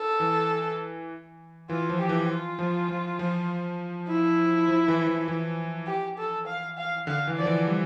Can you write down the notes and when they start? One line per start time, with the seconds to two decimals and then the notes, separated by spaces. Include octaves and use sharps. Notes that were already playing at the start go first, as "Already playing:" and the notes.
Already playing: A4
0.20 E3
1.69 E3 F4
1.89 F3
1.99 G4
2.09 E3
2.29 F4
2.59 F3
2.89 F3
3.19 F3
4.08 E4
4.68 F3
4.88 E3
5.07 E3
5.28 E3
5.87 G4
6.18 A4
6.47 F5
6.78 F5
7.07 D3 F5
7.27 E3
7.37 F3 D5
7.46 E3
7.67 G3